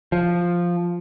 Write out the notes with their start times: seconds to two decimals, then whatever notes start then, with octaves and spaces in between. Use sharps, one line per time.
0.12 F3